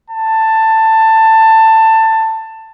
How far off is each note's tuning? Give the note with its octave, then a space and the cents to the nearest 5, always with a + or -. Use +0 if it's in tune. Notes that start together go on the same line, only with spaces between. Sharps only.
A5 +15